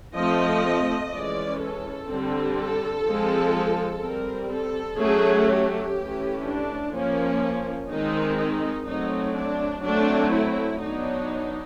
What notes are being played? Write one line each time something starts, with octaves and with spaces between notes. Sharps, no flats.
F3 A3 C4 D#5
E3 G#3 C#4 D5
A4
D3 G3 C4
A4
F3 G#3 C4
G3 C4 A#4
A4
F#3 A3 C#4 G#4
G4
E3 A3 C#4
D4
F3 A#3 C#4
D#3 G#3 C4 D#4
D#4
F#3 A3 C4 D#4
D4
F#3 A3 C4 D4
E4
F#3 B3 D4 D#4